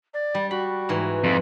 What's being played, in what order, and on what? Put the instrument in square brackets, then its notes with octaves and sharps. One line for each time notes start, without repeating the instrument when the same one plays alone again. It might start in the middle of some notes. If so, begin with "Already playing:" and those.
[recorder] D5
[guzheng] G3
[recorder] F#4 [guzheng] B5
[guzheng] G#2 E3
[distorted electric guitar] F2